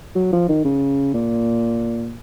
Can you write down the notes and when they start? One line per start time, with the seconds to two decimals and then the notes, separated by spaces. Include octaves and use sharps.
0.16 F#3
0.33 F3
0.49 D#3
0.65 C#3
1.14 A#2